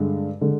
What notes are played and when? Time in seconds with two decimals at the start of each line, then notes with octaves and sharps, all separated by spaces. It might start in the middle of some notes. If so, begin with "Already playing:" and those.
Already playing: G2 D3 G#3
0.41 D3 G#3